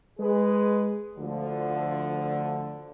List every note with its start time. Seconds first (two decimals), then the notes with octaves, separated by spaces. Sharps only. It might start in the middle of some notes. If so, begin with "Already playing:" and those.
0.19 G#3 G#4 B4
1.18 D2 D3 F3